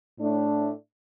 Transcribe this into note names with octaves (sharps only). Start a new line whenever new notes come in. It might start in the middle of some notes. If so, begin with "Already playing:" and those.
A2 A3 D4